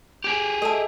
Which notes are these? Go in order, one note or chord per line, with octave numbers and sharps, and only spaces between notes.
G4 G#4
A4 D#5 E5 A5